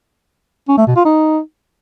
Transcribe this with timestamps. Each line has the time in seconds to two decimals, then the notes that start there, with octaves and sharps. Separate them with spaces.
0.69 C#4
0.78 A3
0.87 B2
0.96 F4
1.05 D#4